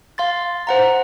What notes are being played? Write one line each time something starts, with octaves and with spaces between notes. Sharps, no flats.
F5 C6 A6
C5 F#5 A#5